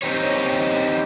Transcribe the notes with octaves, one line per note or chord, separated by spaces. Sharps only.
C4 D#4 G4 C#5